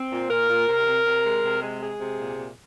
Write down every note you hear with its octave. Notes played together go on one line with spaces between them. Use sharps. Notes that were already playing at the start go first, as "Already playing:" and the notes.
Already playing: C4
A#2
A#2 A#4
A#2
C3
C3
C3
G#3
C3
G#3
G#3 G#4
C3
A#2
A#2